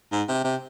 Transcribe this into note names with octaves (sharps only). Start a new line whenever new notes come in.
G#2
C3
C3